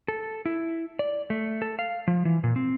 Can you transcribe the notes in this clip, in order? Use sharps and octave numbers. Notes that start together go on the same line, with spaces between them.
A4
E4
D5
A3
A4
F5
F3
E3
A#2
C4